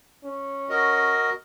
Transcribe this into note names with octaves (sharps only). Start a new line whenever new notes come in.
C#4
F#4 A#4 D#5